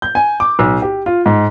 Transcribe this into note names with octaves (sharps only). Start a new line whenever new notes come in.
G6
G#5
D6
B1
G4
F4
G#2